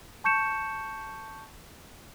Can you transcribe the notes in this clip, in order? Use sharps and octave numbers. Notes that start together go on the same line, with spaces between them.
A5 C#6 G6 C#7 E7